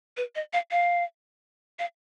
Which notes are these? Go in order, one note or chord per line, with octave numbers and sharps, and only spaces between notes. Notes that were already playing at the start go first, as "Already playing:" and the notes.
B4
D#5
F5
F5
F5